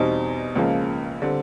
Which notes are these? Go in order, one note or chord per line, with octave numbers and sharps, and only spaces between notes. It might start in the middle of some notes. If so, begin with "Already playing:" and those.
Already playing: E2 B2 G3 C4 D#4
C#2 C#3 F3 A#3
D3 G3 C4